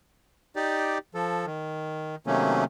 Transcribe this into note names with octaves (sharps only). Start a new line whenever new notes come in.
D#4 G4 D5
F3 A4
D#3
C3 D#3 F#3 A3 A#3 C#4